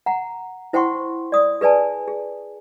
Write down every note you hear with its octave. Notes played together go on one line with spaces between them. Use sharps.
F#5 A#5
E4 C5 F#5 G5 C6 C#6
D5 D#6
G#4 B4 D5 G#5 A5
G#4